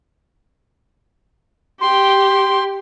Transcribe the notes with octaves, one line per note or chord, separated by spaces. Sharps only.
G4 C6